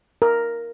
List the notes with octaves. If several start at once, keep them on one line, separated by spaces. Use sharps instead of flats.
A#4